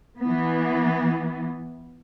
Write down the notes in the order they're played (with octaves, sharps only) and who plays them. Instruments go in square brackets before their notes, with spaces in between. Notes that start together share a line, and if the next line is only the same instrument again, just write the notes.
[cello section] E3 B3